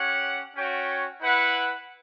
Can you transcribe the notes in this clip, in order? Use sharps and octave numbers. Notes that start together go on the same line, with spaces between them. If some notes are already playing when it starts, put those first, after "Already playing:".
Already playing: C#4 G4 C#5 F#5
C#4 F#4 C#5 G5
E4 B4 F#5